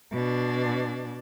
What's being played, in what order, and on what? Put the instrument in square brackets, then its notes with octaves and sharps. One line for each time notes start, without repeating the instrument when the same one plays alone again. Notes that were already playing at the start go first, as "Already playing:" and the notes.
[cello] B2 D4